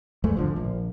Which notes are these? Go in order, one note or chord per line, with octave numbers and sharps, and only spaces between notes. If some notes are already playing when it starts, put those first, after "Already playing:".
E2 G#3 A3
G#1 D3 F3
A#1